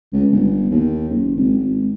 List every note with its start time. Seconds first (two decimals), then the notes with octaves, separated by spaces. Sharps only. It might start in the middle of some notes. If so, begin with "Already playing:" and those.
0.13 C#2
0.32 G1
0.70 D#2
1.09 F#1
1.36 G#1
1.57 G#1